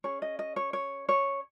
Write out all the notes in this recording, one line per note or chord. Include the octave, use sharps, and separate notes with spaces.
C#4 G#4 C#5
D#5
D#5
C#5
C#5
C#5